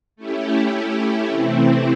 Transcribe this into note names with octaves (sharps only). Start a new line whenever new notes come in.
A3 C#4 E4 G4
C3 E3 A3 C4 E4